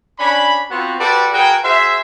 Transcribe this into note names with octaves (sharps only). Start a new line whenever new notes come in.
C#4 D4 B5
B3 C4 F4 F#4
F#4 G4 A4 B4 C5 D5
F#4 G#4 A#4 B4 G5
F#4 G#4 C5 E5